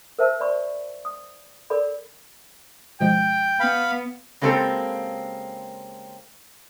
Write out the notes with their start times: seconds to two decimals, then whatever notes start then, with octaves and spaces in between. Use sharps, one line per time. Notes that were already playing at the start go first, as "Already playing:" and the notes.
0.19 A#4 C5 E5 A5 E6
0.40 D5 B5 C#6
1.05 D#6
1.70 A4 A#4 D5 B5
3.00 B2 F3 G#3 G5
3.60 B3 F5 B5
4.41 C#3 G#3 A#3 C4 G4 A4